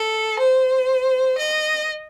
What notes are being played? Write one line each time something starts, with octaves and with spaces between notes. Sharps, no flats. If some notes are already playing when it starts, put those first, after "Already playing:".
Already playing: A4
C5
D#5